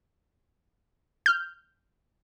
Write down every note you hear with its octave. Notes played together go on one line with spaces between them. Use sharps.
F6 G6